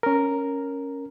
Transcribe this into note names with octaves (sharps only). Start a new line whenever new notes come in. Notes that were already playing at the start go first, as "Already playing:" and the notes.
C#4 A#4